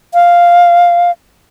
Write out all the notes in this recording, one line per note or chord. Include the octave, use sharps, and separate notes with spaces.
F5